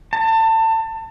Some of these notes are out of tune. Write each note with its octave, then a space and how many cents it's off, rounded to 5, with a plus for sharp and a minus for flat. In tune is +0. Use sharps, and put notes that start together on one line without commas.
A5 +30